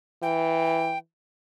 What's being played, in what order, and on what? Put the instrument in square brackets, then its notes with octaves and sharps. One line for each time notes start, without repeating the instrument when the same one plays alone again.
[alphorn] E3 [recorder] G5